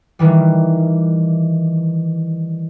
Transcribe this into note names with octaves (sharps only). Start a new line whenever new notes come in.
D#3 E3 G3